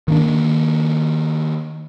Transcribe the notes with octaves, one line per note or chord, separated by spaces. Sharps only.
D#3 A#3 D4